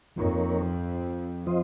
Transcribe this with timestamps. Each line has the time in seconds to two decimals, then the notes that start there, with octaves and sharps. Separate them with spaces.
0.16 F2 F3 A#3 D#4 A#4 C#5
1.46 F3 C4 F4 C5 D#5